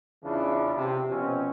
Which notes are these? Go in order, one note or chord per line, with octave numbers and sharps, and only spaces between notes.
E2 C#3 E3 D4 F4
C3
B2 F3 C4 C#4